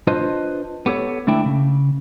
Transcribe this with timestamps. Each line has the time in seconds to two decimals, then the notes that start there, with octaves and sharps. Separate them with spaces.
0.07 D4 F4 B4 C5 D#5
0.86 B3 G4 A4 C#5
1.27 D3 A3 D4 E4 G5
1.46 C#3